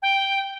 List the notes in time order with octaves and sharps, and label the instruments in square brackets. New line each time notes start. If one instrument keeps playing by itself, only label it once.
[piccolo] G5